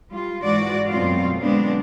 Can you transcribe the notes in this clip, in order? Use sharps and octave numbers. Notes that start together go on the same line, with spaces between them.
G3 F4
G#2 E3 F#4 D5
F#2 B2 A3 C4 F4 F5
D3 G#3 B3 C4 D4